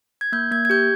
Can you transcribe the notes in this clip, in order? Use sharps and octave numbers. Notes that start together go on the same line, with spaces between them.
G#6
A#3 G6
A#3 G#6
G#6
G4 G6